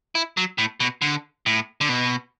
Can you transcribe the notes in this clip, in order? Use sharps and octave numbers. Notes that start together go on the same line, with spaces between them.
E4
F#3
A2
B2
D3
A2
D3
B2